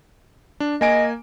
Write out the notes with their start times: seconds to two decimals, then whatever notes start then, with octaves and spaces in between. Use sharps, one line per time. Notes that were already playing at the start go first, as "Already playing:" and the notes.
0.60 D4
0.81 A#3 D#5 G#5 D7